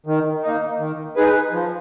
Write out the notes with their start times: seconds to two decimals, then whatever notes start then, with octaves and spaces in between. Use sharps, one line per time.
0.06 D#3
0.43 A#3 D#4
0.79 D#3
1.16 G#3 D#4 G#4 B4
1.52 F3